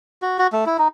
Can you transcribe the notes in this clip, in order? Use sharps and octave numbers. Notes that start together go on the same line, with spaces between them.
F#4
F#4
A3
E4
D#4